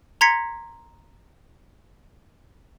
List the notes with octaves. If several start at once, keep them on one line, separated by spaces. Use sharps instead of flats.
A#5 C6 G#6 A#6 B6 C#7